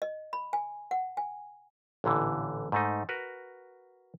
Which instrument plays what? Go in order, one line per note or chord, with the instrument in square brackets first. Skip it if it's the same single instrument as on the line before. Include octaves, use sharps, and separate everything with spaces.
[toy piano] D#5
B5
G#5
F#5
G#5
[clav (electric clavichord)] A1 A#2 D3 E3
G#2 A3 D#4
F#4 A#4 B4